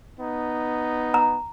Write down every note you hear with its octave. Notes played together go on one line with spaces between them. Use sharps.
B3 D#4
A#5